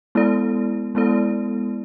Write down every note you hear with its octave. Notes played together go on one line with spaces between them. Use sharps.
G#3 B3 E4 A4 D5
G#3 B3 E4 A4 D5